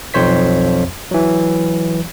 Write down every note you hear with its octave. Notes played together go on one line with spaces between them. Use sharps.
B1 F2 C5 C#5 B6
E3 F#3